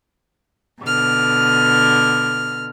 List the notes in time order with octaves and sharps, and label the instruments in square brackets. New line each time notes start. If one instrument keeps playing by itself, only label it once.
[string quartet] B2 D3 F6